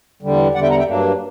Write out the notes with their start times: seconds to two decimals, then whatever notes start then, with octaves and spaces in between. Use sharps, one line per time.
0.22 E2 D3 G3
0.54 E2 D3 G3 D5 F#5
0.62 E5 G5
0.70 F#5 A#5
0.78 E5 G5
0.86 G2 F#3 A#3 D4